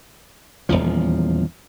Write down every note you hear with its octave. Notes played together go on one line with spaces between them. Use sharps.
D#1 A1 E2 F3